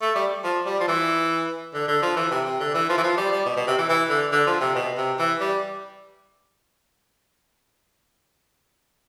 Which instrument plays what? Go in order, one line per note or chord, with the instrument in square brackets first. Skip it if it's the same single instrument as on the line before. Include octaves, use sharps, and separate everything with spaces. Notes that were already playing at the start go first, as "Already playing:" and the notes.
[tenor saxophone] A3
G3
F3
G3
F3
E3
D3
D3
F3
E3
C3
C3
D3
E3
F3
E3
F3
G3
G3
B2
B2
C3
E3
E3
D3
D3
F3
C3
B2
C3
E3
G3